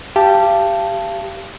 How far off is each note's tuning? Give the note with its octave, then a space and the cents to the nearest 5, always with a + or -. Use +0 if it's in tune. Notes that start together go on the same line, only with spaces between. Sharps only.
G4 +0 F5 -40 A5 +0